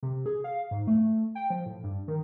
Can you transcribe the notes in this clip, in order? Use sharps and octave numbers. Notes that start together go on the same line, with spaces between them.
C3
G#4
F5
G#2
A3
G5
F3
A2
G2
D#3